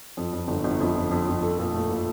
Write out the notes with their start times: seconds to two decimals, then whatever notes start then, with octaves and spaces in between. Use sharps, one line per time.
0.17 F2
0.33 F2
0.48 G1
0.64 G1
0.80 F2
0.95 F2
1.11 F2
1.27 F2
1.42 A4
1.59 A#2
1.74 A3
1.89 A#2